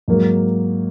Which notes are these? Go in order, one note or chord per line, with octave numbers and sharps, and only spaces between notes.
G#2 F#3 A#3